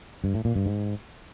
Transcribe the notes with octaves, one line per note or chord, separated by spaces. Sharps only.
G2
A2
A#2
G2
G#2